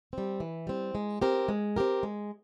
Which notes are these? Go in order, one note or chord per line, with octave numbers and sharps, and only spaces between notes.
G3 C4
E3
G3 C4
G#3
C4 G4 A#4
G#3
C4 G4 A#4
G#3